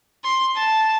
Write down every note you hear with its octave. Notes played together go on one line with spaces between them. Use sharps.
C6
A5